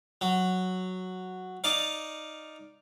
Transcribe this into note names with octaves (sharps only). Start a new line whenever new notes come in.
F#3
D#4 D5 F5